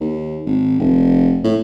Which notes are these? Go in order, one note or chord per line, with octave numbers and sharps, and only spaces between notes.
D#2
G#1
F1
A2